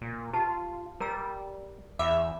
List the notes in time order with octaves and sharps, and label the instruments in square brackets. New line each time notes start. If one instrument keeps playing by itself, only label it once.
[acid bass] A#2
[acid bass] F4 [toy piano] G4 A5
[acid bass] G3 [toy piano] A#4 A#5 E6
[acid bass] E2 [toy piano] G#4 B5 D6 [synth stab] E5